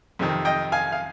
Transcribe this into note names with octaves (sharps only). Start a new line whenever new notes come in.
F2 C3 D#3
D#5 G5
F5 G#5
F5